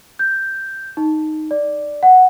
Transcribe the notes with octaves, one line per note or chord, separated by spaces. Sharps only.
G6
D#4
D5
F#5